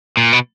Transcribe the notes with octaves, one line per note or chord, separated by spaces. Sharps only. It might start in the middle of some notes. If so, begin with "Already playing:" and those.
A#2
B2